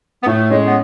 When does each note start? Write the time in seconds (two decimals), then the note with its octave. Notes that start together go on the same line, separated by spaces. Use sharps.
0.22 B3
0.26 A2 A3
0.50 G#3 C#4
0.64 B3